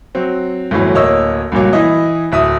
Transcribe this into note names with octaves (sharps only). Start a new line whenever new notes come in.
F#3 C4
G1 A2 E3 F#3
D1 A#3 C#5 D#5 E6
C#2 G2 A#2 F#3
E3 E4 D#5
D1 E5 D#6